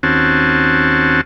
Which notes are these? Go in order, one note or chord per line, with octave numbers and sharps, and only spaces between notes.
D#2 C4 C#4 F#4 A5